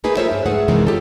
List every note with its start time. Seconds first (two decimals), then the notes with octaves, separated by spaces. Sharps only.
0.04 A3 A#3 D#4 G#4 B4
0.17 F4 A4 A#4 C5 C#5 E5
0.31 G2
0.46 G#2 A3 G#4 B4 F#5
0.68 F#2 C3 D#3 E3 G#3 C#4
0.87 F4 G4 A4